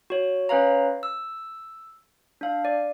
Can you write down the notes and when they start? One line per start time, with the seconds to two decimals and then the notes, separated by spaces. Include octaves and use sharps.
0.10 F#4 C#5
0.49 C#4 B4 C#5 F5 A#5
1.03 E6
2.41 D4 F5
2.65 D5